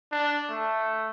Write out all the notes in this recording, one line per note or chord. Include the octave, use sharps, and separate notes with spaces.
D4
A3